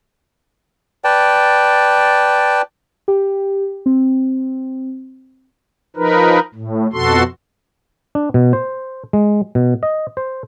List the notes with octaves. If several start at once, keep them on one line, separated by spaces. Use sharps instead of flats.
B4 D5 G5 A5
G4
C4
F3 D#4 A#4 B4
A2
F2 B2 F#4 A4 C6
D4
B2
C5
G#3
B2
D#5
C5